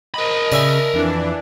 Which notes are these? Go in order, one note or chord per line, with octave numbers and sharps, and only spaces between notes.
A#4 D#5 B5
C#3 D5 E5 G#5
F2 E3 D4